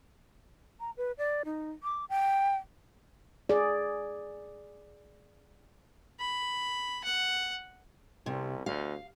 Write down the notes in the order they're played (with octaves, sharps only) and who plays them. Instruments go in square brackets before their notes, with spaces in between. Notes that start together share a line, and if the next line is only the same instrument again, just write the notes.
[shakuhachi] A#5
B4
D5
D#4
D6
G5
[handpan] G#4 D5
[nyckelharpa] B5
F#5
[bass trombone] C2 [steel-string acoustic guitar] C3
[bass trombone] D2 [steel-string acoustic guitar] F5